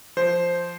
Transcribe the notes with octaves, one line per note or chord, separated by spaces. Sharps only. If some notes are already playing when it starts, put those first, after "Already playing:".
F3 C5